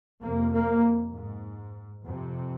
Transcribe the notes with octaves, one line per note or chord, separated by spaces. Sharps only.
F2 C3 A#3
A#3
G#2
F2 C3